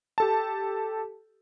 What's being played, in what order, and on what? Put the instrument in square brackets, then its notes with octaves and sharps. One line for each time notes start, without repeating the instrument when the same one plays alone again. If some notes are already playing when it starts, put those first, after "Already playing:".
[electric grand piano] G4 A4 A5